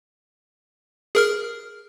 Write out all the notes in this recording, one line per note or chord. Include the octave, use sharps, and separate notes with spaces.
G#4 A#4 F6